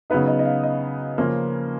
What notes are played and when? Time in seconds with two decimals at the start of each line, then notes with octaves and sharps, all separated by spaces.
0.10 C#3 F#3 B3 D#4 B4
0.28 D#5
0.39 D#5
0.45 F5
0.64 D#5
1.18 C#3 F3 A#3 C#4 F4